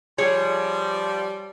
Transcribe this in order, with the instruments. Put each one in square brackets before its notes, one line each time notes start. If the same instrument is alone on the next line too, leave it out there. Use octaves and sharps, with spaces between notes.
[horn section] F3 G3 [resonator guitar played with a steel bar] G#4 C#5